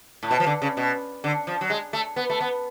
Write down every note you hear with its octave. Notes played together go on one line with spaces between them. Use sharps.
A2
B2
F3
D3
C#3
B2
D3
F3
F#3
G#3
A3
B3
A3
B3